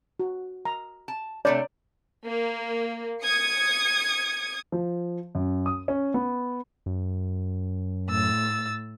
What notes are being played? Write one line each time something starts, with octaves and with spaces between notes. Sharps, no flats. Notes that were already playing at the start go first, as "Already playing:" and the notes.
F#4
A#5
A5
C3 A3 D4 C#5 D5
A#3
D#6 G#6 C#7
F3
F#2
D#6
C#4
B3
F#2
A2 E6 A6